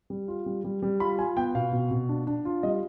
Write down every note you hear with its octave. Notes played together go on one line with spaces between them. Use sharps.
G3
F4
G3
G3
G3
F4 B5
F4 G#5
B3 G5
B2 F5
B2
B2
D4
D4
F4
G3 D#5